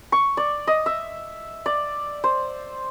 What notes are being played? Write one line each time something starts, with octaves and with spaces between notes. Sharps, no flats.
C#6
D5
D#5
E5
D5
C5